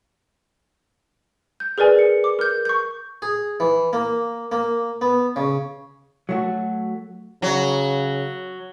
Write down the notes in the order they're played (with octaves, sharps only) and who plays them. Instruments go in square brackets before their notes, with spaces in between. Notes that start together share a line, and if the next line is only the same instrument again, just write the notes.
[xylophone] G6
G#4 A#4 B4 D5 G#5
C#7
D6
A#4 G6
C#6 G6
[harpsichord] G#4
E3
A#3
A#3
B3
C#3
[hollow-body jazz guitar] F#3 A3 F#4
[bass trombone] C#3 [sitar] F#3